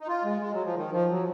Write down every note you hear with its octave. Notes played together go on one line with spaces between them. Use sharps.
D#4
F4
G#3
G#3
F#3
F3
D#3
F3
F#3